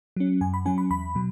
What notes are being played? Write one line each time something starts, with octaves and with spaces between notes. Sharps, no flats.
F#3 C#4
F#2 G#5
B5
F#3 C#4 G#5
B5
E2 B5
B2 F#3